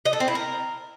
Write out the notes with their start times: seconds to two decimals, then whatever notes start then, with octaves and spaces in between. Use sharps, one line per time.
0.05 D#5
0.13 A4
0.20 C4
0.28 E4
0.35 A#4